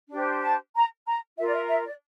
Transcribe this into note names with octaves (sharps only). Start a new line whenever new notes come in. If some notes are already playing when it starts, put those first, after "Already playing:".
D4 G4 C5
A5
A#5
A#5
F4 A#4 E5
D5
E5
E5
D5